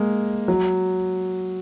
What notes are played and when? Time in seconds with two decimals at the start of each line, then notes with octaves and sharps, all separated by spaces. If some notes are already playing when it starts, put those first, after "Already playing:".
Already playing: G#3 A#3
0.48 F#3